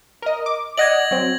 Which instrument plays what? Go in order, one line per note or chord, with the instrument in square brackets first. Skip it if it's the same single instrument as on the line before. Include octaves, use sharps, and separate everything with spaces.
[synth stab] A#4 D#5
D6
[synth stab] D5 D#5 F#5 [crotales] G#6 A#6 F#7
[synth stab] F#3 C4